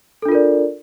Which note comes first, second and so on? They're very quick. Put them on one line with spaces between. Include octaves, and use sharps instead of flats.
A4 D4 F4 A#4 D5